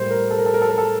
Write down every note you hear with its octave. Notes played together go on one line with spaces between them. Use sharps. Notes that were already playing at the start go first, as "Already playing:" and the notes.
Already playing: A2 G3 A#3 C5
A#4
A4
A#4
A4
A#4
A4
A#4
A4